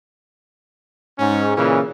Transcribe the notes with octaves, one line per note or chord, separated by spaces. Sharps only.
G#2 C#4
A#2 C#3 E3 C#4